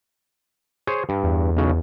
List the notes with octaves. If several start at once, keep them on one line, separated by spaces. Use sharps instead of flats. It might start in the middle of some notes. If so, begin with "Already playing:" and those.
G#4 C5 C#5
G2
E2
B1 C#3